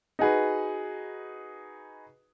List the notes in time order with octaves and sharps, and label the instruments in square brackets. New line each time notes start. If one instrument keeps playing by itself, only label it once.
[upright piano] D#4 F#4 G#4 B4